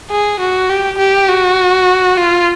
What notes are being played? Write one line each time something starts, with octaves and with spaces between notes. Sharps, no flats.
G#4
F#4
G4
G4
F#4
F4